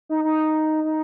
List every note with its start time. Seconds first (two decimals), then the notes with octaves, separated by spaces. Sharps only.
0.09 D#4
0.24 D#4
0.84 D#4